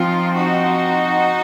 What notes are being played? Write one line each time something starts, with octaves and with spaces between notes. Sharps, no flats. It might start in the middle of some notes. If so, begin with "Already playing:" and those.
Already playing: F3 C4 D#4 F4
D#4 F#4